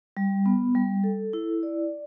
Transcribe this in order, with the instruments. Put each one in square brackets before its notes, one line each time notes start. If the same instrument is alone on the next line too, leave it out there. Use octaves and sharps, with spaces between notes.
[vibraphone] G3
B3
G3
A4
E4
D5